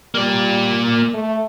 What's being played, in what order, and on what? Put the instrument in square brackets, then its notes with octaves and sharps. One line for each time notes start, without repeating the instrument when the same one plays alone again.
[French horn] G3 [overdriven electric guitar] A#3 D5
[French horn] A3